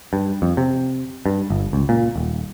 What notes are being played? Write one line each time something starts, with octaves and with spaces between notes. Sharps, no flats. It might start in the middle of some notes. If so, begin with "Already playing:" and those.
G2
F2
C3
G2
G1
C#2
A#2
D#1